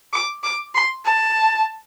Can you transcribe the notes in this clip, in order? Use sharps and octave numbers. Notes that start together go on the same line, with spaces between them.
D6
D6
C6
A5